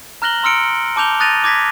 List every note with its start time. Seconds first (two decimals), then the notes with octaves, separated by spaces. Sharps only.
0.22 A#5 F6 F#6 A#6 F#7 G7
0.43 A#5 C6 E6 F6 C#7 D7
0.96 A5 D6 G6 F7 G7
1.20 D#6 F#6 A6 A#6 D#7 F7
1.44 D6 G#6 A#6 B6